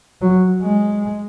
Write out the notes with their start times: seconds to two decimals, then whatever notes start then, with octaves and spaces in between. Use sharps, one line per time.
0.21 F#3
0.62 G#3